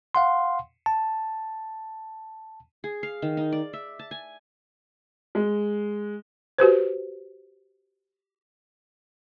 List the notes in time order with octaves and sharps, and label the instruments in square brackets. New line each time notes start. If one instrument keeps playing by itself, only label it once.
[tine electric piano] F5 F#5 C6
A5
[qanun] G#4
F5
D#3
D#4
D5
E5
A5
G#5
[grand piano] G#3
[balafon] F#4 G4 B4 C5